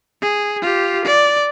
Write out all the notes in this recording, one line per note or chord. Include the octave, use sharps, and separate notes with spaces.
G#4
F4 G4
D5